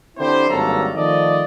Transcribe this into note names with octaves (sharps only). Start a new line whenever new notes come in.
D3 C4 E4 G4 C5
G#1 G2 F#3 A#3 A4 A#5
D#3 F3 A3 D5 D#5